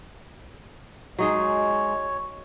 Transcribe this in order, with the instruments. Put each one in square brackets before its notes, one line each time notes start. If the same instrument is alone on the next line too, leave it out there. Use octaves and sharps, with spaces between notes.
[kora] F#3 D#4 G#4 [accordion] G#3 [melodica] C#5